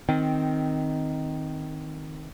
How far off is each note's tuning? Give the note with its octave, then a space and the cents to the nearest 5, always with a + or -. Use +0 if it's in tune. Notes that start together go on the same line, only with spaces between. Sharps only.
D#3 +0 C4 +0